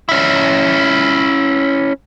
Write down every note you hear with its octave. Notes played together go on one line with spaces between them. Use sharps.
C#4 E4